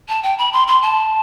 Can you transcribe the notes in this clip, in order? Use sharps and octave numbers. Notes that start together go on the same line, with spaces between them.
A5
G5
B5
C6
C6
A5